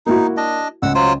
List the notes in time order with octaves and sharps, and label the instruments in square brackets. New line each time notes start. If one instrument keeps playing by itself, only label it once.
[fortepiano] A#3 E4 F#4 [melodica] D#4
[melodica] D4 D#5
[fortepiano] C#2 [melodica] F#5 E6
[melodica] F#3 F4 C5